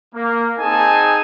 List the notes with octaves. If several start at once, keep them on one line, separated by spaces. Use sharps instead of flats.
A#3
C4 D#4 G#4 G#5 A5